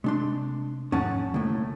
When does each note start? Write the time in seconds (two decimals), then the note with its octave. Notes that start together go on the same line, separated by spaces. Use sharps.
0.04 C3 G#3 D4 C6
0.92 E2 G#2 F3 C#4 F#5 A5
1.34 C2 A2 D3 A3 A#3